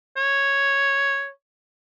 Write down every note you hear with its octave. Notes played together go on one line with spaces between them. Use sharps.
C#5